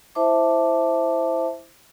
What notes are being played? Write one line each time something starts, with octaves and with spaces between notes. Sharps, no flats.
E4 C5 E5 A5 D6